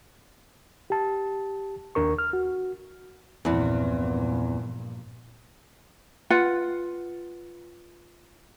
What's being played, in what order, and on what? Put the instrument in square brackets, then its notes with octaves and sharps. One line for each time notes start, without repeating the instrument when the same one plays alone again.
[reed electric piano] G4 A5
D#2 D4 A#4 C#6
F6
F#4
[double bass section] A#1 G2 A#2 [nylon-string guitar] E2 C4 [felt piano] E3
[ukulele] F4 B4 F#5